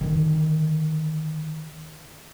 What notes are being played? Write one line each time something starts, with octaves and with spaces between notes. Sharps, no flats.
D3 D#3